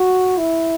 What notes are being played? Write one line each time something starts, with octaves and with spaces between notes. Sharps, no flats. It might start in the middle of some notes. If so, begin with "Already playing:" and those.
Already playing: F#4
E4